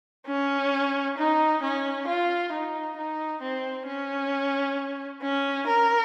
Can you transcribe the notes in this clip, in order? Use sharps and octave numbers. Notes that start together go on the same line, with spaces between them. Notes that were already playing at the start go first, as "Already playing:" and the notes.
C#4
D#4
C#4
F4
D#4
D#4
C4
C#4
C#4
A#4